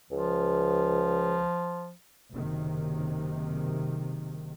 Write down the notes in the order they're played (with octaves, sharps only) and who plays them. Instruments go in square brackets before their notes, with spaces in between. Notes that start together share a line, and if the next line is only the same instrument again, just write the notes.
[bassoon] C#2 [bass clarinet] F3
[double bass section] F#1 C3 D#3